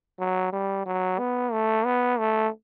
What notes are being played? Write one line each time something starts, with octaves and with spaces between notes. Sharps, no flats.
F#3
G3
F#3
B3
A3
B3
A3